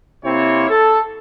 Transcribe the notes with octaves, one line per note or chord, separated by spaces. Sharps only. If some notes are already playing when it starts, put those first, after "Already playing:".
C3 A#3 C4 E4 C5 C#5
A4